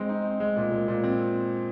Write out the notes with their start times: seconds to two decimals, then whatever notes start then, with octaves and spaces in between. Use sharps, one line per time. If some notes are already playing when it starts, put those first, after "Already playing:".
Already playing: G#3 C4
0.09 D#4
0.25 C4
0.40 G#3
0.56 A#2
0.72 A#2
0.88 A#2
1.03 C4